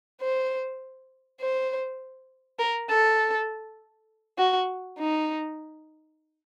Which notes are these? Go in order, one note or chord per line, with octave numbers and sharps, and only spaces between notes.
C5
C5
A#4
A4
F#4
D#4